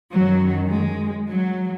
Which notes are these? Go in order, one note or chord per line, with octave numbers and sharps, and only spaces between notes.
F#2 D#3 F#3
G#3
F#3